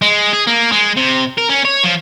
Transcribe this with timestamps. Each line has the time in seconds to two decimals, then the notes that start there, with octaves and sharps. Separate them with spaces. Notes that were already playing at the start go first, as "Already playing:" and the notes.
0.02 G#3
0.33 G#4
0.47 A#3
0.72 G#3
0.96 C3
1.38 A#4
1.49 C#4
1.65 C#5
1.84 F3